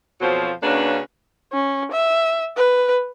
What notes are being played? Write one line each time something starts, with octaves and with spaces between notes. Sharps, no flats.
F2 B2 F3 F#3 F4 C5
C#3 A#3 C#4 D4 F#4 B4
C#4
E5
B4